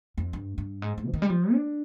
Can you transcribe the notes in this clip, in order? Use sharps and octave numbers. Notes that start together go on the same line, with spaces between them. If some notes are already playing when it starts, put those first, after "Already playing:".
F2
G2
G2
G#2
G#2
F3
D#3
G3
F3
D4